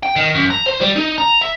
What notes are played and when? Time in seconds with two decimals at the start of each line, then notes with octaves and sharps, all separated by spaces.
0.03 G5
0.16 D#3
0.35 F#2
0.51 A#5
0.67 C5
0.81 G3
0.96 D#4
1.18 A#5
1.41 E5